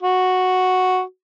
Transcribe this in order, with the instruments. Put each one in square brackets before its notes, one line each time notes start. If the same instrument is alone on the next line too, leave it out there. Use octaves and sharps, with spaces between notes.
[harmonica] F#4